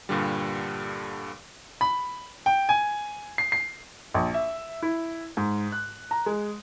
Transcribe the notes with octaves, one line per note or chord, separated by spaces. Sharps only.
G2 A#2 D3 G3
B5
G5
G#5
C7
C7
A#1
E5
E4
G#2
F#6
A#5
G#3